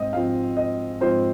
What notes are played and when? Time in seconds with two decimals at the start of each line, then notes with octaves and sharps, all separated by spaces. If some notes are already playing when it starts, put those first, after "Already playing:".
Already playing: G#2 C4 D#5
0.13 G#2 F3 C4 F5
0.57 D#5
1.01 G#2 F3 C4 C5